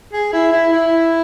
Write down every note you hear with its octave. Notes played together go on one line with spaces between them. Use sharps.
G#4
E4
E4
E4